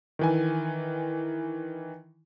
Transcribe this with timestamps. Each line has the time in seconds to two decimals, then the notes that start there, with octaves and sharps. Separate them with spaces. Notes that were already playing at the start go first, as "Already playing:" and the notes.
0.19 D#3 E3 G#5